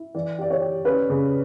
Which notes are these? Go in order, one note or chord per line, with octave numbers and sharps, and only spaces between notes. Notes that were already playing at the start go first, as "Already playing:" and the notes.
Already playing: E4
E3 D5
G4 D5
C#5
G4
C#4 B4
C#3